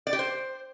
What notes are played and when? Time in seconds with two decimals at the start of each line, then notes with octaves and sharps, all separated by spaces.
0.07 D5
0.13 G4
0.19 C5